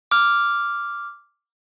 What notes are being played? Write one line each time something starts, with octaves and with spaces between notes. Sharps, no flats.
D6 F6